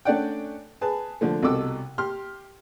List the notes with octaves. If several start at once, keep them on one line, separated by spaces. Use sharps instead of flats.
A3 C#4 D4 D5 F#5 G5
G#4 B4 A5
D3 F3 A3
C2 B2 A4 D6 E6
G4 C6 F6